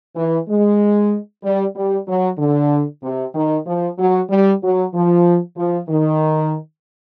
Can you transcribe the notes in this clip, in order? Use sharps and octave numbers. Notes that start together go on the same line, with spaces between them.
E3
G#3
G3
G3
F#3
D3
C3
D#3
F3
F#3
G3
F#3
F3
F3
D#3